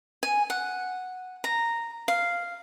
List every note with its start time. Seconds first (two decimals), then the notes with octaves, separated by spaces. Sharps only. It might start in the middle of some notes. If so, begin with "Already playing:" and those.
0.23 G#5
0.50 F#5
1.44 A#5
2.08 F5